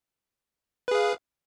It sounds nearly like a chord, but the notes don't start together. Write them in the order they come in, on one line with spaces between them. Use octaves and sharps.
B4 G#4 F5